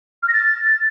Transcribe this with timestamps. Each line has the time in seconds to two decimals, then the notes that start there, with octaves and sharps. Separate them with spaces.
0.23 F6
0.28 A#6
0.34 A6